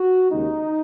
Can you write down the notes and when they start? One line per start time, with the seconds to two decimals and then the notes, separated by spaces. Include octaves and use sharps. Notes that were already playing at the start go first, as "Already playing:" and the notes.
Already playing: F#4
0.31 D#2 C#3 G#3 D#4